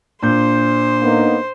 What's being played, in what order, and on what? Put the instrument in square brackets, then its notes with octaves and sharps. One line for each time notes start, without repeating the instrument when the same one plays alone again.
[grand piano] A#2 G6 [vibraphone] D4 [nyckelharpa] C5
[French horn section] A#3 B3 D#4